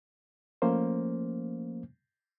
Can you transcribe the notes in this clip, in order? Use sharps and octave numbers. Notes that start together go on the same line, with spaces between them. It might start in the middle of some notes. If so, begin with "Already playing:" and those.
F3 A3 A#3 C#4 C5